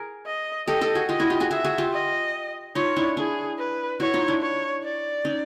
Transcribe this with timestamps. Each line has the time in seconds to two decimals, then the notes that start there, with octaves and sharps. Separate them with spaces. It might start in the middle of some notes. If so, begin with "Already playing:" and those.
Already playing: G#4 A#4
0.26 D#5
0.67 G4 A4 D#5
0.81 G4 A4
0.95 F#4 G#4
1.09 F4 G4 D#5
1.20 E4 F#4
1.30 F4 G4
1.40 F#4 G#4
1.51 F#4 G#4 E5
1.64 F#4 G#4
1.78 F4 G4
1.93 D#5
2.75 D#4 F4 C#5
2.96 D4 E4
3.17 D4 E4 G#4
3.58 B4
4.00 E4 F#4 C#5
4.14 D#4 F4
4.28 D4 E4
4.42 C#5
4.83 D5
5.25 C#4 D#4